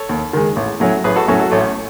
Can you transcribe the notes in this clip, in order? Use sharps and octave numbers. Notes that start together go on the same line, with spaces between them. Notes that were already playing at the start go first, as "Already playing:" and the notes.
Already playing: A4 C#5
D#2
D#3 G#3
A1
A2 F#3 C#4
A1 G#4 B4
F#4 A4
A2 F#3 C#4 F#4 A4
F#4 A4
A1 A3 C#4